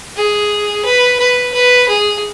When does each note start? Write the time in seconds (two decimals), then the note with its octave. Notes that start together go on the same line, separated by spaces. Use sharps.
0.17 G#4
0.85 B4
1.19 B4
1.54 B4
1.88 G#4